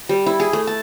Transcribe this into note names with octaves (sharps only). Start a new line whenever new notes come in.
G3
E4
G#4
A3
A5